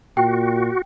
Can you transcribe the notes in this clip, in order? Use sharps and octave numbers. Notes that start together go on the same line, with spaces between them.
A#2 F#4 G5